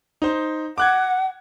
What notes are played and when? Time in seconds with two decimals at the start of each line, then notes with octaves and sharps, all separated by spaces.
0.22 D#4 C5
0.78 F#5 D6 F#6 G#6